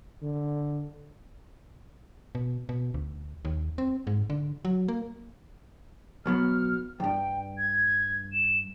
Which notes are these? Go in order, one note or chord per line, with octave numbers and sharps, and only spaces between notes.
D3
B2
B2
D2
D#2
C4
G#2
D3
F#3
A#3
B1 F#3 B3 F6
E2 G2 G5
G#6
E7